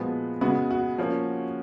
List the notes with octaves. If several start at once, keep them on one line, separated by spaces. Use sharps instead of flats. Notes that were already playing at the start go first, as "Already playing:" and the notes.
Already playing: A#2 F3 G#3 B3 F#4
C#3 G#3 B3 F#4
F#4
F3 A#3 C#4